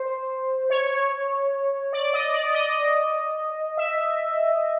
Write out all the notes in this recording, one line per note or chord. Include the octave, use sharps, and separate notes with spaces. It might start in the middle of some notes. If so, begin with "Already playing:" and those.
Already playing: C5
C#5
D5
D#5
D5
D#5
E5